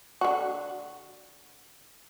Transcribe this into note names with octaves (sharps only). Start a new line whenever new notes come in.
D3 F#4